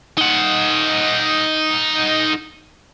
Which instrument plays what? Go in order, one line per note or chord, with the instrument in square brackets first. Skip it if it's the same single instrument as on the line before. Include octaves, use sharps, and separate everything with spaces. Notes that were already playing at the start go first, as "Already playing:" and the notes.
[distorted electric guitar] D#4 F#5